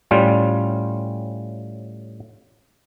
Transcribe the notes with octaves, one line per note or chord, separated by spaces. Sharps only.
A2 G3 C#4 F4